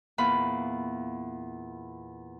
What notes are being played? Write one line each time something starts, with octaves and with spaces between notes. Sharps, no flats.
E2 A#2 F4 F5 B5